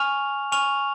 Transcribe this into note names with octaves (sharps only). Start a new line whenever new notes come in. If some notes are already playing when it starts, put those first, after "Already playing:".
Already playing: G#5 C#6 F6 F7
G#5 C#6 F6 F7